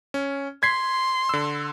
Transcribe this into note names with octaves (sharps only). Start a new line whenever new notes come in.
C#4
C6 G#6 B6 C7
D3 E6